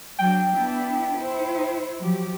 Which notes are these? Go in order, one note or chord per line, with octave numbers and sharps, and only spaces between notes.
F#3 D4 G5
B3 D4 E4
E4 C5
F3 F#3 G4